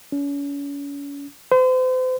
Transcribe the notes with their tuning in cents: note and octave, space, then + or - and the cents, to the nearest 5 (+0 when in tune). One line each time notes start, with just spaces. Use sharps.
C#4 +35
C5 -40